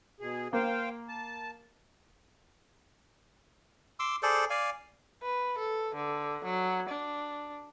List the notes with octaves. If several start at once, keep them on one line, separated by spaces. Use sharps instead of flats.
B2 G#4
A#3 C5 F5 G5
A5
C6 D6 E6
G#4 A4 C5 D5
D5 F5 G#5
B4
A4
D3
F#3
D4